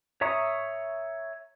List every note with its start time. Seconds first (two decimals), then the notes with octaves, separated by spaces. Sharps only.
0.21 C#5 E5 A#5 C#6 D#6